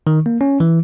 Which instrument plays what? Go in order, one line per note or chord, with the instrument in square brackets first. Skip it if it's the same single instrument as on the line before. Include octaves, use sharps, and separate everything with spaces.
[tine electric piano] D#3
A#3
C#4
E3